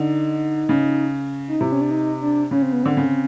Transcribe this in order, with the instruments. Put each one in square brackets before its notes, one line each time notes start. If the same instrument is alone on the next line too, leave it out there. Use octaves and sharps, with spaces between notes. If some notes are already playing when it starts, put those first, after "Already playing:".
Already playing: [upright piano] D3 [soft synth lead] D#4
[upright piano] C#3
[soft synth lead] D#4
[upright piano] C3 [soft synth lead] E4
[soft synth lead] C#4
D4
D#4
D4
[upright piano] C#3 [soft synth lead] C#4
[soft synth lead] C4
B3
[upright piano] D3 [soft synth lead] C4
[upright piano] C#3